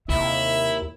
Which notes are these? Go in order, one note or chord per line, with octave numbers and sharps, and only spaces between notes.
D#2 C3 E4 E5